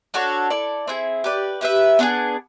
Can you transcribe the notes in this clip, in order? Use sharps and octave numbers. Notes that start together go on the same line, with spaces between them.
D4 F#4 A4 C#5
E4 A4 D5
C4 E4 G#4
G4 B4 D5
E4 G4 B4 E5
B3 D4 F4 G#4